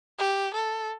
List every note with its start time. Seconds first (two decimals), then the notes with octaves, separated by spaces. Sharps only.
0.19 G4
0.54 A4